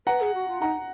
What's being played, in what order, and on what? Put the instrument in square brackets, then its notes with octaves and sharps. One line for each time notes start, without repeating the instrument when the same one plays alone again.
[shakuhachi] B4 [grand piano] F#5 A#5
[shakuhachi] G#4
F#4
F4
[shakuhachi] D#4 [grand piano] F#5 A#5